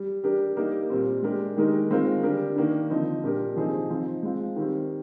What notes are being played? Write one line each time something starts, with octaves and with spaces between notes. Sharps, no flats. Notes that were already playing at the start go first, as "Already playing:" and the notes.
Already playing: G3
G3 D4 G4 A#4
G3 A#3 D#4 G4 A#4
A#2 G3 C4
G#3 D4 G4 A#4
D#3 G#3 D#4 G4 A#4
D#3 G#3 C4 F4 A#4
D3 G3 D4 G4 A#4
D#3 A#3 D4
D3 F3 C4 D#4
A#2 G3 D4 G4 A#4
C3 F3 C4 D#4 G#4
F3 C4 D#4
G#3 C4 F4
D#3 G3 C4